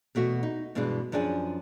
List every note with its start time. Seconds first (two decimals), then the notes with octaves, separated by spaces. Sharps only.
0.15 E2 B2 A3 F#4
0.43 D#4
0.75 G2 B2 E3 G#3 D4
1.12 F#2 F3 D4 G#4 G5 G#5